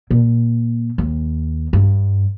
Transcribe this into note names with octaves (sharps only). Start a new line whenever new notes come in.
A#2
D#2
G2